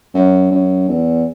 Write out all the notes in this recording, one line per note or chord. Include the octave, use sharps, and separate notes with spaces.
F#2
F#2
E2